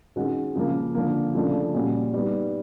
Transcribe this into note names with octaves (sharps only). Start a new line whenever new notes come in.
D#3 G#3 C#4 F#4
C#3 F3 A#3
D3 F3 A#3
C#3 F3 A3 D4
A#2 G3 A#3 C#4 F#4
G3 B3 D#4